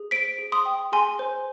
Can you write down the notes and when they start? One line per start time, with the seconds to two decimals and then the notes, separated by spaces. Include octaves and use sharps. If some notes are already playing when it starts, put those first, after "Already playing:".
Already playing: G#4
0.11 C5 B6 D7
0.38 G#4
0.52 C6 D#6
0.65 G5
0.92 G#4 G#5 C6
1.19 C5